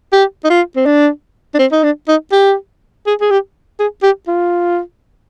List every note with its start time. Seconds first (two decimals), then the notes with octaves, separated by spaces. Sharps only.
0.13 G4
0.44 D#4
0.50 F4
0.76 C4
0.86 D4
1.54 D4
1.59 C4
1.72 D#4
1.83 D4
2.08 D#4
2.32 G4
3.06 G#4
3.21 G#4
3.31 G4
3.79 G#4
4.03 G4
4.28 F4